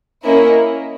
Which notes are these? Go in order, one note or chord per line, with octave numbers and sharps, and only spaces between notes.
A#3 C#4 E4 A#4 D#5